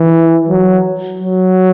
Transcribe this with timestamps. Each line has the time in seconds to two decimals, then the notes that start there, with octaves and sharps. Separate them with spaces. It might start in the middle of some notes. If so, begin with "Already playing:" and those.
Already playing: E3
0.48 F#3
1.18 F#3